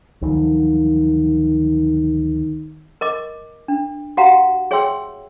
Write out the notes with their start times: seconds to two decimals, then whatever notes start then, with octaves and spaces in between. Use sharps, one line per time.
0.22 D2 D#3 F3 F#3
3.01 A#4 D#5 D6
3.68 D4
4.17 F#4 G4 F5 F#5 A#5
4.71 G#4 C#5 E5 G5 C6 E6